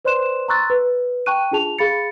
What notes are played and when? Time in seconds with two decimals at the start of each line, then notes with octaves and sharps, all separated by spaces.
0.05 B4 C5 D5 C6 F#6 E7
0.48 A#5 C6 C#6 E6 F#6 A6
0.70 B4
1.26 G5 A5 C#6 F#6 D#7
1.51 D4 F4 G#4 A5 F7
1.78 G#4 F5 B5 A6 C#7